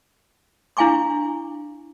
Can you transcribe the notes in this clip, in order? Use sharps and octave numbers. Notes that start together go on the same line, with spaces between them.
D4 E4 F5 G#5 C#6 D6